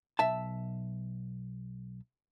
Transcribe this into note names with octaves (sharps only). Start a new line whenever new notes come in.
B1 E5 A5